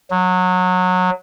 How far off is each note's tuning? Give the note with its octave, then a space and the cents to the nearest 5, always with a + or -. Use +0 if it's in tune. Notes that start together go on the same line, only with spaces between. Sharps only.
F#3 -20